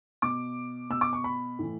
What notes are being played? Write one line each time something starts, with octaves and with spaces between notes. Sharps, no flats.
B2 D6
B2 E6
D6
C#6
B5
A2 E3